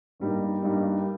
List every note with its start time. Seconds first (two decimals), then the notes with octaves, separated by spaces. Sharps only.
0.20 G2 G3 A#3 D#4
0.62 G2 G3 A#3 D#4